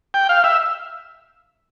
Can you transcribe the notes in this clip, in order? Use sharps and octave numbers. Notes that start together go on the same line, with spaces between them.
G5
F5
E5